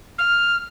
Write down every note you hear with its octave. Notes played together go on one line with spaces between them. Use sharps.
F6